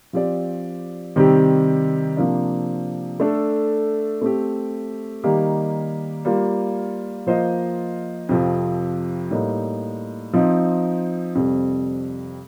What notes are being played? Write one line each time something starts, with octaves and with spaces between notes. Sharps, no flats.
F3 C4 G4 D5
C3 D#3 G3 C4 G4
C3 F3 A#3 D4
A3 D4 A4
A3 C4 G4
D#3 G3 A#3 D#4 G4
G3 A#3 F4
F3 A#3 F4 C5 D#5
F2 C3 F3
A2 G3 A#3 D#4
F3 C4 D#4
F2 C3 G3